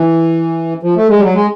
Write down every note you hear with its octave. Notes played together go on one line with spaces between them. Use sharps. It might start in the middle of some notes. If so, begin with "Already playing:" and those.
Already playing: E3
F3
A3
G#3
G3
F#3
G#3